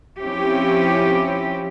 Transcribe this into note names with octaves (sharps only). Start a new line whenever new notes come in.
F3 C4 C#4 E4 G4